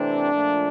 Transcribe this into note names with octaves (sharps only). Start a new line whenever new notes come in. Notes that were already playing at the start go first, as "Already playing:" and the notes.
Already playing: C3 E3 A3 C4 D4
A#2 F3 A3